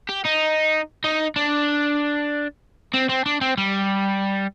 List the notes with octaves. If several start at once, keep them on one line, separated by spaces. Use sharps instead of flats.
G4
D#4
D#4
D4
C4
C4
D4
C4
G3